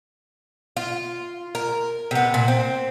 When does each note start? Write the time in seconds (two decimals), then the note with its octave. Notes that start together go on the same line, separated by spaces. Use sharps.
0.77 F4
1.55 A#4
2.11 C3 B3
2.34 A#2
2.48 C4